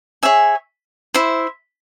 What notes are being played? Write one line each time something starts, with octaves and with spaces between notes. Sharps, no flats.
G#4 C#5 E5 G#5
E4 C5 E5